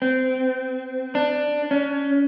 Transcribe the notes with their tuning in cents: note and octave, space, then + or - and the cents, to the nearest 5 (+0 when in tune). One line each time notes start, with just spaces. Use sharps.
C4 -25
D4 +10
C#4 +20